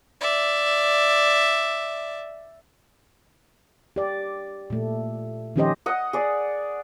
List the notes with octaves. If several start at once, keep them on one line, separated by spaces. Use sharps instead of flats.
D5 E5
G4 D5
A#2 A3
D#3 F3 C#4 G4 C5 D#5
D#5 F#5
G#4 D5